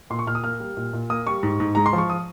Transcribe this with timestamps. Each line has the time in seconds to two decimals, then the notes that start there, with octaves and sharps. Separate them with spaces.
0.10 A#2 C6
0.19 C#6
0.27 A#2 F6
0.35 D#6
0.44 A#3 F6
0.60 G3
0.77 A#2
0.93 A#2
1.10 A#3 D#6
1.26 G3 C#6
1.43 G#2
1.60 G#2
1.75 G#3 A#5
1.86 C6
1.93 F3
1.98 C#6
2.10 D#6